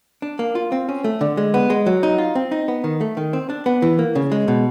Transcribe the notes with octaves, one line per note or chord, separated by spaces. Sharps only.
D4
A#3
F4
C4
C#4
A3
D3
G#3
B3
G#3
F#3
D#4
F4
C4
D#4
B3
D#3
A3
D#3
C4
D4
B3
E3
A#3
C#3
G#3
B2